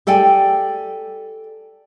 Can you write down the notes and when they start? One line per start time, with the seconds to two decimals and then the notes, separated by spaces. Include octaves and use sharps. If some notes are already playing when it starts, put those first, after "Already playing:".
0.07 G4 A4 D5 G5 G#5